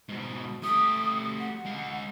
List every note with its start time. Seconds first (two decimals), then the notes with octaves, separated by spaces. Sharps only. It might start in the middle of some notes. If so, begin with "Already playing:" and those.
0.09 G#2 B2
0.63 A3 G4 D#6
1.39 F#5
1.66 G#3 F5